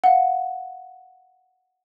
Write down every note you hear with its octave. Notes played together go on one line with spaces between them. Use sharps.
F5 F#5